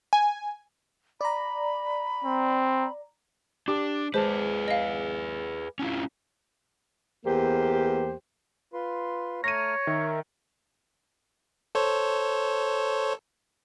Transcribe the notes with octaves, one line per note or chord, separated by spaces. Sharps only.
G#5
D5 A#5 B5
C4
D4 G4 D6
G#3 G#4 B4 C5 A5
D#5 F5
C#4 E4 F4
E2 A#3 G4 C5
F4 B4 C6
A3 C#5 A#5 F6 A#6 D#7
D#3 A#4 E5
A4 C5 C#5